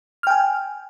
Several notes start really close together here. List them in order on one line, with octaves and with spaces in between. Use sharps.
F6 G5 G#5